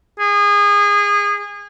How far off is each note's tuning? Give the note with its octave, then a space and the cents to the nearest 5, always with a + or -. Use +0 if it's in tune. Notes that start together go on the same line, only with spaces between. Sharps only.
G#4 -25